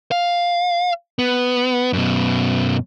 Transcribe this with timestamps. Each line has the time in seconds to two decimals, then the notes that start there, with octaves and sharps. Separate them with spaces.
0.11 F5
1.19 B3
1.93 F#2 B2